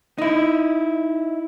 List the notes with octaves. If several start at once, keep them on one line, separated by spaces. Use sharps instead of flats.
D#4 E4